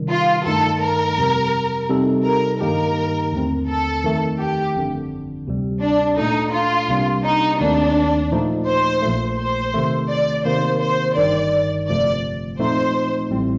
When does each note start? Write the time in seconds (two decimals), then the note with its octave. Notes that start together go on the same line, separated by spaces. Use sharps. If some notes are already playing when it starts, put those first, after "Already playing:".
Already playing: C3 D#3 G3
0.11 F4
0.46 G2 D#3 A3 D#4 A4
0.83 A#4
1.17 F2 C3 G3
1.89 C3 G3 C4 D#4 A4
2.25 A#4
2.60 G2 D#3 A#3 D#4 G4 A#4
3.32 D#2 D3 A3 C4
3.68 A4
4.04 F2 D#3 A3
4.39 G4
4.74 G1 F2 D3
5.47 D2 C3 G3
5.81 D4
6.17 A#2 A3 D4 D#4 A4
6.53 F4
6.88 C2 C3 G3 A#3 D4
7.24 D#4
7.60 D#2 D#3 A3 C4 D4
8.32 A#2 F3 A3 D#4
8.67 C5
9.02 A#1 A#2 A3
9.38 C5
9.74 C3 D#3 A3
10.10 D5
10.45 C3 D#3 A#3 C5
10.81 C5
11.17 G1 G2 D#3 D5
11.88 G1 F2 C3 F3 A3 D5
12.59 A#2 F3 A3 C4 D#4 C5
13.30 A1 A2 G3 C4